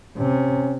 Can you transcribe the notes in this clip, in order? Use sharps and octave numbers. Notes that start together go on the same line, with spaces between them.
C3 C#4